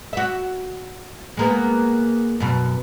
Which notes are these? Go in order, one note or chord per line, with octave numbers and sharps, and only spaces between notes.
F#4 E5
G#3 A#3 B3
F#2 B2